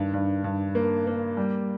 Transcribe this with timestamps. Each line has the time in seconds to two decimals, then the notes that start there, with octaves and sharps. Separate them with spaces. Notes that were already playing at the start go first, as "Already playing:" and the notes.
Already playing: G2 D#3
0.13 G2
0.44 G2
0.75 A#3
1.07 A#3
1.37 G3